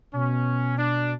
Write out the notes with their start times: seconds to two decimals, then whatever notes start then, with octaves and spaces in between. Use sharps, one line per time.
0.13 B2 C#4
0.78 D4